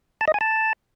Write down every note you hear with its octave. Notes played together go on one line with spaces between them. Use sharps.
A5
D#5
G#5
A5